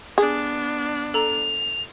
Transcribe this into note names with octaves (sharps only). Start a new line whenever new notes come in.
B3 D4 G#4
A4 A#5 F7